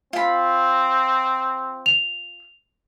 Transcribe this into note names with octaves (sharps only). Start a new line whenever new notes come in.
C4 F4 B5
F7